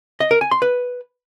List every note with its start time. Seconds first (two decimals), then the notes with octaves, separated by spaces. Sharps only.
0.20 D#5
0.31 A#4
0.41 G#5
0.51 C6
0.62 B4